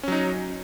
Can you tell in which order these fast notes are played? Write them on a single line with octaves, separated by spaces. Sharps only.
C#4 F#3 D#4